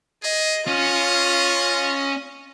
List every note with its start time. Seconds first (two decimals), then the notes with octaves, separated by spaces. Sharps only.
0.23 G#4 D#5
0.67 C#4 F4 D#5